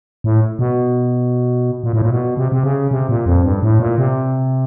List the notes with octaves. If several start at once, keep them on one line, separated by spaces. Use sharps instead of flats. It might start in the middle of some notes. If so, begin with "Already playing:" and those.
A2
B2
A#2
A2
A#2
B2
C3
C3
C#3
C3
A#2
F2
G2
A2
A#2
C3